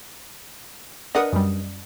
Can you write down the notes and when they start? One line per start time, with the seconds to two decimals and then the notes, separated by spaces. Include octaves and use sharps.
1.15 D4 A#4 B4 D#5 F#5 D#6
1.33 F#2 G3